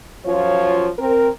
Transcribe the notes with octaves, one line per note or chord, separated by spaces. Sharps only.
F#2 F3 F4 C#5
C4 A#4